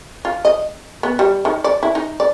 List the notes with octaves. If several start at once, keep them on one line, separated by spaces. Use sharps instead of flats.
F4
D#5
B3
G3
D#3
D5
E4
D#4
D5